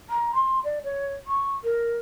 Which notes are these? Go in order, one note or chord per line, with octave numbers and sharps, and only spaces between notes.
A#5
C6
D5
C#5
C#6
A#4